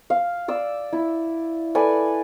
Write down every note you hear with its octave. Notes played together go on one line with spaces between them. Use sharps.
F5
D5 E6
E4
A4 B4 D5 G#5